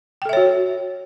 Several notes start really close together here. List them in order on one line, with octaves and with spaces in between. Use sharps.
G5 A4 E5 C#5 F#4